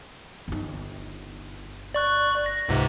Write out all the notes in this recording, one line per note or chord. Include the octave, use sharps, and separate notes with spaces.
G1 D#4
D5 C#6 F#6
A#6
C#2 G#2 C3